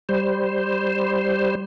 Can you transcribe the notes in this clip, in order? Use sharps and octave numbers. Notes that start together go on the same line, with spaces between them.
G3 C5